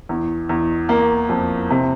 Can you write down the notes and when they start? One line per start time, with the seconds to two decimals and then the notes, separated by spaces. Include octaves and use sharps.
0.09 E2
0.49 E2
0.89 A#3
1.29 F2
1.70 C3